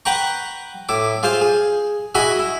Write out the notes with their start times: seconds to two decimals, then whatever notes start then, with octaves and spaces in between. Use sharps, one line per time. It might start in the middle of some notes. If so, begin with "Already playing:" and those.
0.05 B4 F#5 G5 A#5 C#6
0.89 A2 E4 D6
1.23 F4 G#4 C5 F5
1.41 G#4
2.15 E4 F#4 G#4 D#5 G#5 B5
2.39 E4